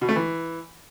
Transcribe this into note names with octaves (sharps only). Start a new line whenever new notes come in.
B2
A3
E3